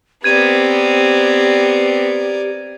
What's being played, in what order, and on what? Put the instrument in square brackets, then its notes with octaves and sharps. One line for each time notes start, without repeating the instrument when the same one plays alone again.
[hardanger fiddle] B3 C4 [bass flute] G4 [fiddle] A#4 D5 [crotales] G#6 D#7